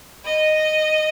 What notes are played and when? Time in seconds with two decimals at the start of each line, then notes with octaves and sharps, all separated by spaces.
0.25 D#5